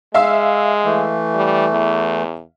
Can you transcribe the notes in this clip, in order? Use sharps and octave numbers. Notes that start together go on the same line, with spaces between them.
G#3 E5 F5 E6
E3 A3
G3
E2